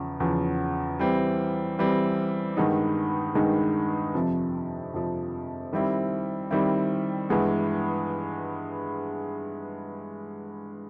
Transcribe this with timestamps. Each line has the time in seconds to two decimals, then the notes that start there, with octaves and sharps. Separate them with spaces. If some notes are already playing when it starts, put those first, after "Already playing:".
Already playing: E2 C#3 F3
0.20 E2 C#3 F3
0.99 E3 G3 C4
1.79 E3 G3 C4
2.57 G2 D#3 G#3 B3 D#4
3.35 G2 D#3 G#3 B3 D#4
4.14 F2 C3 F3
4.94 F2 C3 F3
5.73 D#3 G3 C4 E4
6.51 D#3 G3 C4 E4
7.30 G2 E3 G#3 B3